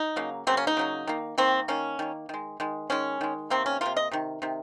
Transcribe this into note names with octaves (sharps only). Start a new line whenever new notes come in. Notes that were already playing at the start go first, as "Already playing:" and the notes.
Already playing: D#4
C#3 F#3 A#3
C#3 F#3 A#3 C4
C#4
D#4
C#3 F#3 A#3
D#3 A#3
D#3 A#3 C4
D#3 A#3 C#4
D#3 A#3
D#3 G#3
D#3 G#3
D#3 G#3 C#4
D#3 G#3
C3 D#3 A#3 C4
C#4
C3 D#3 A#3 F4
D#5
C3 D#3
C3 D#3